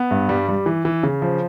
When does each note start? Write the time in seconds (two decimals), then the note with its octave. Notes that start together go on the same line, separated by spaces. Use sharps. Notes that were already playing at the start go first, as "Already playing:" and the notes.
Already playing: B3
0.11 G2
0.29 G3
0.49 G3
0.66 E3
0.85 E3
1.03 C#3
1.22 F3